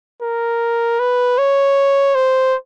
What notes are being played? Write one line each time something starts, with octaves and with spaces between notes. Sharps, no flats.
A#4
B4
C#5
C5